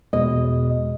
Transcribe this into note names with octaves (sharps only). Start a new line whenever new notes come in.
E2 B2 G#3 D#5